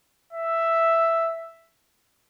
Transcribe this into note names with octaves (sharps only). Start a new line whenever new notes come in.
E5